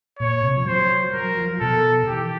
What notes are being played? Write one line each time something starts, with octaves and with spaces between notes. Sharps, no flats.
A#2 C#5
C3
F3
F#3 C5
F#3 A#4
F3
B2 A4
E3 G4